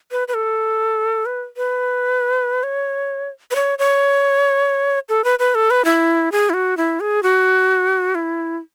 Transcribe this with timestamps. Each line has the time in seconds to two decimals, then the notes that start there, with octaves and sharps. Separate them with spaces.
0.12 B4
0.28 B4
0.34 A4
1.26 B4
1.57 B4
2.63 C#5
3.51 B4
3.55 C#5
3.79 C#5
5.09 A4
5.24 B4
5.39 B4
5.55 A4
5.70 B4
5.85 E4
6.32 G#4
6.50 E4
6.54 F#4
6.77 E4
7.00 G#4
7.23 F#4
8.15 E4